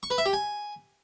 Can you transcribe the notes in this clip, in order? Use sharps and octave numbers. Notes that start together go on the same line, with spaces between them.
C#6
B4
E5
G4
G#5